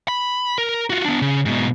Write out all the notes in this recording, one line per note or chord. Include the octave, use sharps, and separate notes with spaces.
B5
A#4
F4 F#4
B3 D4
C#3
G#2 B2